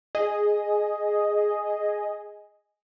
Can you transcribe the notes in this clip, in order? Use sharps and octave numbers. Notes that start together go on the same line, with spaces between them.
G#4 D#5